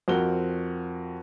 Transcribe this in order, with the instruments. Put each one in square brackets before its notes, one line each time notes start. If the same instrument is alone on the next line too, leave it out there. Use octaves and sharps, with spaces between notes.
[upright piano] F2 C4 F#4 A#4 G7